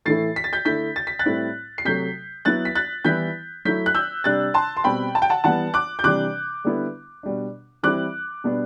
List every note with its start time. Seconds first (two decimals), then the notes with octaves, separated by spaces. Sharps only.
0.05 A2 E3 A3 E4 A6 C7
0.36 B6
0.44 A6
0.53 G6 B6
0.65 D3 A3 E4 G6 B6
0.96 A6
1.07 B6
1.19 F#6 A6
1.26 A2 G3 C4 E4
1.78 C7
1.85 C3 F#3 A3 G6 B6
2.45 F#3 B3 E4 F#6 A6
2.65 B6
2.75 F#6 A6
3.05 E3 G3 B3 E4 G6 B6
3.65 F#3 A3 E4 G6 B6
3.86 F#6
3.95 E6 G6
4.24 C3 G3 D4 F#6 A6
4.54 A5 C6
4.77 C6
4.84 B2 G3 C4 G5 B5
5.15 A5
5.22 G5
5.30 F#5 A5
5.44 E3 G3 B3 F#5 A5
5.74 D6 F#6
5.99 G6
6.04 C3 E3 G3 D4 D6 F#6
6.64 D3 G3 B3 E4
7.23 B2 G3 D4
7.83 E3 G3 C4 E4 D6 F#6
8.44 B2 G3 B3 D4